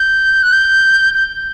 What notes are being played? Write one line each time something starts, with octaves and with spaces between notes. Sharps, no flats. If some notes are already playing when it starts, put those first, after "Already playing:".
Already playing: G6
F#6
G6
G6